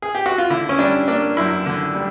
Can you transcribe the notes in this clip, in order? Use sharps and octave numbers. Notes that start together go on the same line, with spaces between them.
G#4
G4
F#4
F4
D3 E4
C#4
G3 D4
A#3 D4
F#2 E4
D3
G3